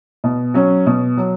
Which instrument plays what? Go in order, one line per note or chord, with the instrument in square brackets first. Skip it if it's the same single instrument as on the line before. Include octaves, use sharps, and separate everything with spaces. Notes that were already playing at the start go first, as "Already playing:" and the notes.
[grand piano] B2
F#3 C#4
B2
F#3